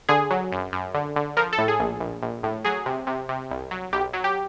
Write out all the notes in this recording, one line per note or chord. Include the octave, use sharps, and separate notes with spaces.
D3 G#4
F#3
F#2
F#2
D3
D3
F3 A#4
A4
A2
G#4
A#1
A#1
A#1
A2
F#3 G#4
C3
C3
C3
C2
F#3
B1 G4
F#3
G4